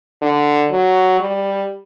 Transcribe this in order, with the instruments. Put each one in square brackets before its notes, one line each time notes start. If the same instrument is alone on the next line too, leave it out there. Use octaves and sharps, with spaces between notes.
[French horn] D3
F#3
G3